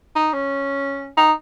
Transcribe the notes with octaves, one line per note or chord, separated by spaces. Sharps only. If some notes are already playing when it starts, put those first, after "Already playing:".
D#4
C#4
D#4